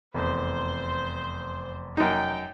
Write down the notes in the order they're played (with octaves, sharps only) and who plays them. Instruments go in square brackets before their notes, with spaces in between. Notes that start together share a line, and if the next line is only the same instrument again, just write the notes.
[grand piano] F1 E2 [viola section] C5
[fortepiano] F#2 D#4 [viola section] G5